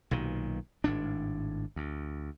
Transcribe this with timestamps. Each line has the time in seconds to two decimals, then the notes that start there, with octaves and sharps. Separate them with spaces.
0.11 B1 A#2 D#3
0.84 G#1 A2 D4
1.76 D2